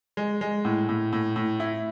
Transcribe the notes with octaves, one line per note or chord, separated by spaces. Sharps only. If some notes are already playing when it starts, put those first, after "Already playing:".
G#3
G#3
A2
A2
A2
A2
E4